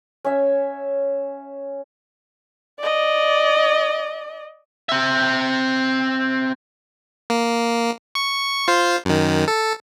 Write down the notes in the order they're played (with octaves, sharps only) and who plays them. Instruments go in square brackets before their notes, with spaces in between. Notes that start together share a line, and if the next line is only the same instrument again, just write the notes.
[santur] C#4 C#5 E5
[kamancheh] D5 D#5
[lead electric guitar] C4 E5
[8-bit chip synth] A#3
C#6
F4 C5
F#2 D#3
A4